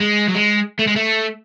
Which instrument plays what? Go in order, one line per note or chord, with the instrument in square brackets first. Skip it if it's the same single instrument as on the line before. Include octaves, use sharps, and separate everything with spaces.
[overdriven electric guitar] G#3
F#3
G#3
A3
G#3
A3